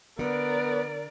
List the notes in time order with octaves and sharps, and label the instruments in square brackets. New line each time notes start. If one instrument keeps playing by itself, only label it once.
[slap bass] D3 [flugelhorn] B3 [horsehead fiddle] A#4 D5